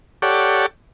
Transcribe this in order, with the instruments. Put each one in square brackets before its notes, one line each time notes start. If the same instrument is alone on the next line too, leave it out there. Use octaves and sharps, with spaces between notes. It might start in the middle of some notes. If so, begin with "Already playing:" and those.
[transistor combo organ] G4 A4 C#5 D5 F#5